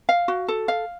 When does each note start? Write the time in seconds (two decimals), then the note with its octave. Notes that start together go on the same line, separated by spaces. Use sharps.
0.09 F5
0.28 F#4
0.48 A4
0.68 F5